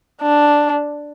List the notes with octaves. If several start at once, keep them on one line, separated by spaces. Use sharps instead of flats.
D4